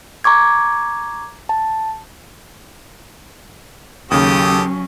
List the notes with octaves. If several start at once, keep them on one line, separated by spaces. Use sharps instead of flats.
A#5 C#6 D6 G#6
A5
D#2 C#3 F#3 C#4 G4 A4 D#6